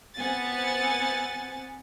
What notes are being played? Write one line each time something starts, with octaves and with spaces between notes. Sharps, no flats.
B3 C4 F#5 G#5 A6